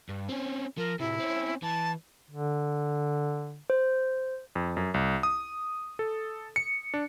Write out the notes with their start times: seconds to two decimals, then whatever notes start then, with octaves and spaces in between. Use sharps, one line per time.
0.09 G2
0.29 C4 C#4
0.77 F3 A#4
0.99 A2 C3 E4
1.20 C4 C#4
1.63 E3 A5
2.31 D3
3.70 C5
4.55 F2
4.77 F#2
4.94 C2
5.23 D#6
5.99 A4
6.56 C#7
6.94 D4